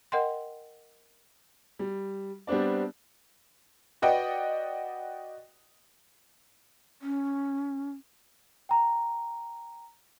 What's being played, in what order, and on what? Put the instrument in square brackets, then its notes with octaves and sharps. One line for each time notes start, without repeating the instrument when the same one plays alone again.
[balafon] A#4 D#5 F#5 G5 C6
[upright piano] G3
G3 B3 C4 D4 D5
F#4 B4 D5 D#5 F#5 G5
[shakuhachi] C#4
[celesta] G5 A#5